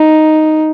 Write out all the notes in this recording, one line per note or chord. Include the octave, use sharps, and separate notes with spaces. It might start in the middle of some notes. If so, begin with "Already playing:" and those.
Already playing: D#4